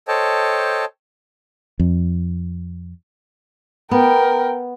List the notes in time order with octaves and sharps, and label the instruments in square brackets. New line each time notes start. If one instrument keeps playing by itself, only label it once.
[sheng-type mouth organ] A4 C5 C#5 D#5 G5 A5
[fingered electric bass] F2
[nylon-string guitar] B3 [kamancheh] A#4 G5